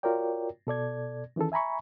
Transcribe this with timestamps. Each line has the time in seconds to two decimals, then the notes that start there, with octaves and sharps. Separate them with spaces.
0.03 F4 F#4 A#4 C#5 D5 G5
0.67 B2 A4 D5 G#6
1.36 D#3 E3 C#4 G#4 A4
1.52 E5 G#5 A#5 B5 C#6